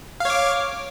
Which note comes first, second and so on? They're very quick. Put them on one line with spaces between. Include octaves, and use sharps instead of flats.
F5 C#5 D6